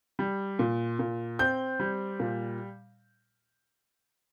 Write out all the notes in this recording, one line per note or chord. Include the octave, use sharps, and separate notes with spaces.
G3
A#2
A#2
C4 G6
G3
A#2